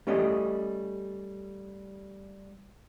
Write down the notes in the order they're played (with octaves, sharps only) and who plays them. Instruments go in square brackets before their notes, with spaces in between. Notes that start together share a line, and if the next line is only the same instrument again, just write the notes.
[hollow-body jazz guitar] G3 A3 C#4 G4 D#5